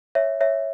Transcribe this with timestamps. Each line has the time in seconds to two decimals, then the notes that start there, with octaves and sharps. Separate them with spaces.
0.15 C#5 E5
0.41 C#5 E5